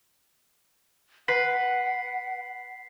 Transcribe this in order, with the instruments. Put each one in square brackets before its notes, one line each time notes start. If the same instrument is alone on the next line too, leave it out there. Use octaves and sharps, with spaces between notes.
[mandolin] B4 [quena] F#5 [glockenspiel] B6 C7